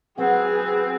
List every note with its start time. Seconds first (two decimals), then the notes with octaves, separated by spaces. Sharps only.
0.18 E2 F#3 C4 G#4 B4 F#5